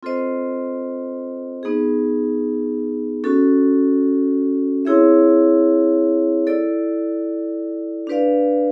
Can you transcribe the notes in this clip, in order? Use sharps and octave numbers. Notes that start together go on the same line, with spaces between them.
C4 F4 A4 C5 D#5
B3 D#4 G#4
C#4 F#4 A4
C4 E4 G#4 C#5 E5
E4 A4 D5
D4 G4 B4 D5 F5